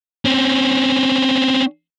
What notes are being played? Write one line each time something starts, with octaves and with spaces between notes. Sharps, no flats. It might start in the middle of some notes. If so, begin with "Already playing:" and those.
C4 C#4